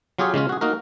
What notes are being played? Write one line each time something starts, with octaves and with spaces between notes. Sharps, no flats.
F#3 F4 G4 G#4 C#5
C#3 G#3 C#4 F4
F#4 G#4
A#3 D#4 F#4 A#4